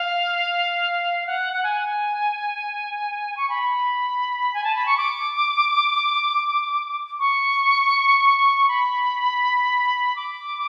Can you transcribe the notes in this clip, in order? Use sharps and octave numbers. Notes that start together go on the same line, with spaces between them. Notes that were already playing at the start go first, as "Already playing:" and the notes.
Already playing: F5
F#5
F#5
G#5
C#6
B5
G#5
A5
B5
C#6
D6
C#6
B5
D6